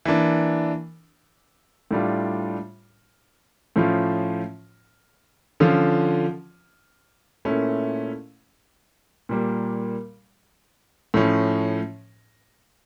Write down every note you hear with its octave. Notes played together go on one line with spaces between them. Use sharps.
E3 A#3 D4
A2 G3 D4 F4
A2 F3 C#4 F4
D3 F3 C#4 F4
A#2 A3 C#4 E4
A#2 G3 A#3
A2 F3 C#4